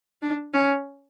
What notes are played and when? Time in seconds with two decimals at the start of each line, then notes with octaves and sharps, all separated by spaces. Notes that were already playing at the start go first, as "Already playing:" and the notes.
0.22 D4
0.54 C#4